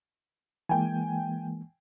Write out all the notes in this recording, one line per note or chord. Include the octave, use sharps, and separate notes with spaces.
E3 G#3 A#3 G5 G#5